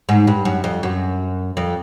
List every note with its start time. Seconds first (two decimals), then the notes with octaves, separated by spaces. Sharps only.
0.09 G#2
0.27 G2
0.45 F#2
0.64 F2
0.83 F#2
1.57 F2